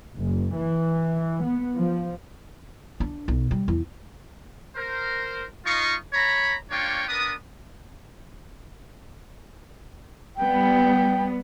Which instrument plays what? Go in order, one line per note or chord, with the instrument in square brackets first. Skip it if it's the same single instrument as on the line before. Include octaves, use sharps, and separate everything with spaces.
[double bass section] F#1
E3
B3
F3
[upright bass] D4
B1
G3
E2
[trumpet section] A#4 C5
D#4 F4 D#5 F5 C#6
C#5 A#5 B5
A#3 D4 F4 C#5 G5 C#6
B3 D4 A#4 B4 D#6
[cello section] G3 B3 [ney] G5